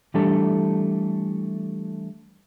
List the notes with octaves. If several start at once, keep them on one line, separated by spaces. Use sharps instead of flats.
E3 G3 A3 D4 G4 A4